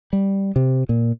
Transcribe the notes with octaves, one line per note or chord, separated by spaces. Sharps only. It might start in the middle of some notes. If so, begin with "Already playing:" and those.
G3
C3
A#2